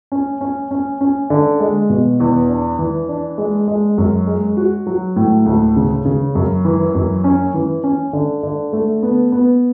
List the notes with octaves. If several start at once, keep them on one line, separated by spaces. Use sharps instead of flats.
C#4
C#4
C#4
C#4
D3
G#3
B2
E2
D4
E3
D4
G#3
G#3
F#2
G#3
F#4
F#3
A2
D2
C#3
C#3
F#2
E3
F#2
C#4
E3
C#4
D3
D3
A3
B3
B3